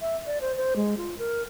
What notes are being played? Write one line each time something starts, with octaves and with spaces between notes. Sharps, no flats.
E5
D5
C5
C5
G#3
F4
A#4